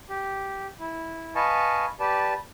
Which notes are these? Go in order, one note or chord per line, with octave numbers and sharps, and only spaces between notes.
G4
E4
B4 D#5 F5 G#5 A5 C#6
G4 B4 D5 A5